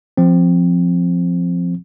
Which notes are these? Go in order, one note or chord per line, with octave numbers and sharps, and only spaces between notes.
F3 C4